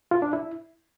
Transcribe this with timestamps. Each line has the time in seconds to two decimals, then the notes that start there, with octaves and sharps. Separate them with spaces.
0.11 F4
0.22 D4
0.33 E4